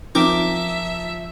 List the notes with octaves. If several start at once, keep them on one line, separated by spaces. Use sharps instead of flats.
F3 C4 D#4 A#4 E5 D6